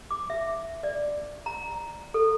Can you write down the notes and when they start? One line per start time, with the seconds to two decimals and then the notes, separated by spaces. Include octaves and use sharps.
0.11 D6
0.30 E5
0.83 D5
1.46 A#5
2.14 A4